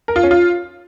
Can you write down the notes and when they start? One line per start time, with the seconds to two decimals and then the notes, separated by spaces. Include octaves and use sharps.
0.08 A#4
0.16 F4
0.23 C#4
0.31 F4